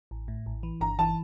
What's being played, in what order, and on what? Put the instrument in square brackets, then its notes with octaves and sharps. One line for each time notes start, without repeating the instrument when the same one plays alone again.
[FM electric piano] A1
A2
A1
E3
[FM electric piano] G1 [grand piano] A#5
[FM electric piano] E3 [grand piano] A5